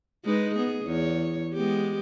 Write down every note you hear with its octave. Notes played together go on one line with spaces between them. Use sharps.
G#3 D#4 B4
B3 G#4
E2 C#5
G#3 B3 G4